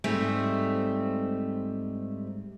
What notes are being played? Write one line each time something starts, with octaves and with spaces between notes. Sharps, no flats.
G#2 G3 A3 C4